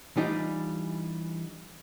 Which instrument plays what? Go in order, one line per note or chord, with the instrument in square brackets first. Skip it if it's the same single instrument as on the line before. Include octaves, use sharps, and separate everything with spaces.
[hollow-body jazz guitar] E3 G3 D4 D#4 F4